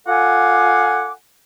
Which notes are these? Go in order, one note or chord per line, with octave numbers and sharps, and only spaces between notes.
F4 A4 F5 F#5 G#5 D6